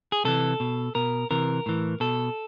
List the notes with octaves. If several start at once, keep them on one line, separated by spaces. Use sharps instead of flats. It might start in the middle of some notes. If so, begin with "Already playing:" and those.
G#4
C3 E3 A4
B2
B2 A#4
C3 E3 A#4
A2 E3
B2 A4